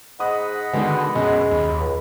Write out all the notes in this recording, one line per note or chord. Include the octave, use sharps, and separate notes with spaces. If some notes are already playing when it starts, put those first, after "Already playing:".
G#2 D#5 F#5 B5 D#6
B2 D3 D#3 G#3
F#2 B2 G#3
D#2 B5
C#2